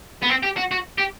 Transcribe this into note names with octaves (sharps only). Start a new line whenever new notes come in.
B3
C4
G4
F#4
F#4
G4